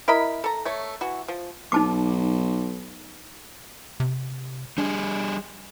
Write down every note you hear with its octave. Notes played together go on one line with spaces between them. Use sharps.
E4 A#4 D#5 B5
A4 A#5
A3 C#5
E3 F#4
F3
B1 D#4 A5 D6
C3
G3 D4 G#4